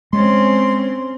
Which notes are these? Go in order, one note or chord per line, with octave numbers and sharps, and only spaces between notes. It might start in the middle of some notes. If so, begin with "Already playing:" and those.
G#3 C4 C#4 C6